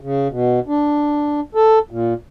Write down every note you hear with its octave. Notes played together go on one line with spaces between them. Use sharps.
C#3
B2
D4
A4
A#2